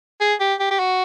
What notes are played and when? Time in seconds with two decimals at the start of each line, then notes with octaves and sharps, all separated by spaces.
0.21 G#4
0.41 G4
0.60 G4
0.71 G4
0.80 F#4